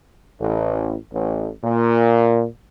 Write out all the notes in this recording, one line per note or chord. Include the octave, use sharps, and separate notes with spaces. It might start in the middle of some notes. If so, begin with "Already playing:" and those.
A1
A1
A#2